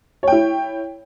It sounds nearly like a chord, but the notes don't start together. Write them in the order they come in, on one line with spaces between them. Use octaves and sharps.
C#5 G5 E4